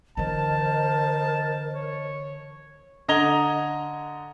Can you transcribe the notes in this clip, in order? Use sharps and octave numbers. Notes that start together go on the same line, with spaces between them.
D3 E3 A#4 C5 D#5 A5
C#5
D3 D#5 A#5 G#6 F7 G7